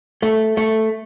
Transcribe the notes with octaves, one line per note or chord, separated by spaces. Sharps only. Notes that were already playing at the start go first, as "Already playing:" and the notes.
A3
A3